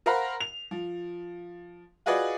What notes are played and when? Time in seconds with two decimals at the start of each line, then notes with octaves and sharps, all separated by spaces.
0.06 A#4 C5 F5 F#5 A#5 B5
0.40 F7
0.71 F3
2.06 F4 F#4 G#4 B4 D5 D#5